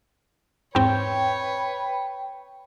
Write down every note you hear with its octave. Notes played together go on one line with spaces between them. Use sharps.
E2 G#2 C4 B4 C#5 G5